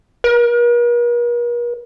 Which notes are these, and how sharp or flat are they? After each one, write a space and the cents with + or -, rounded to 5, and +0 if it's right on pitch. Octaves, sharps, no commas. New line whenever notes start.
A#4 +45